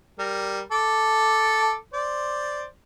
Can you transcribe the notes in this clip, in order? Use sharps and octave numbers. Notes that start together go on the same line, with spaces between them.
G3 A#4
A4 D6
C5 D5